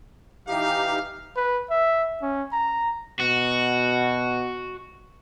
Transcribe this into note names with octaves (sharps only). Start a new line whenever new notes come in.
E3 D#4 G4 F5
B4
E5
C#4
A#5
B2 F#4